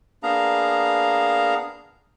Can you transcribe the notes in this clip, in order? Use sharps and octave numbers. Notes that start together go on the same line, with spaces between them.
A#3 B3 D4 G#4 F5 A#5